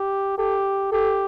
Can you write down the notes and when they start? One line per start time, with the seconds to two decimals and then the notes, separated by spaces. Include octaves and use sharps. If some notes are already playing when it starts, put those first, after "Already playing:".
Already playing: G4
0.38 G4 A4
0.91 G4 A4